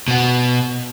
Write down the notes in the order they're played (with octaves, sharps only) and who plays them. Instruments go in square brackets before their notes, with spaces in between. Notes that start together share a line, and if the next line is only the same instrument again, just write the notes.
[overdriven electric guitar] B2 B3